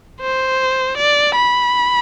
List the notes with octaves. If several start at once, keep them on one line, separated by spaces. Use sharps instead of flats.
C5
D5
B5